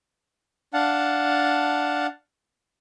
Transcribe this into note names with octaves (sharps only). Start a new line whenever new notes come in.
D4 F5 F#5 A5